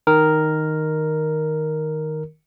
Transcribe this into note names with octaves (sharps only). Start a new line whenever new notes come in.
D#3 A#4